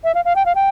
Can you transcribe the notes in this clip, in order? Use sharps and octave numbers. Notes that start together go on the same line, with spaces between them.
E5
F5
F5
G5
F5
G5